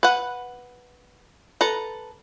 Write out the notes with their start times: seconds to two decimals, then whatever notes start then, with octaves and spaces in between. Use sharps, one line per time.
0.03 B4 F#5
1.61 A4 B4 A#5